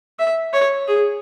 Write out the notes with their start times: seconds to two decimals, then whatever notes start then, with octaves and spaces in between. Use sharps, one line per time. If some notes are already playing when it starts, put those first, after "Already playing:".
0.19 E5
0.53 C#5
0.88 G#4